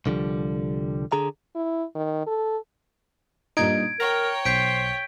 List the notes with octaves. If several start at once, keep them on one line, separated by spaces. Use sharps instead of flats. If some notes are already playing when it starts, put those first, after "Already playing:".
C2 D3 F3 G3
D3 G#4 A#5
E4
D#3
A4
G2 A#2 D#4 G#6 D7
A#4 C#5 G5 A#5
B1 C5 G6 B6 D7